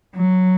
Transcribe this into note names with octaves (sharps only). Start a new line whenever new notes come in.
F#3